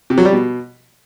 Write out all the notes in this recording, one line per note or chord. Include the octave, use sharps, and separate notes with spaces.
C3
F#3
G3
B2